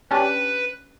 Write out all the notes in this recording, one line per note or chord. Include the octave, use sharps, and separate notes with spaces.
C#4 D4 G4 B4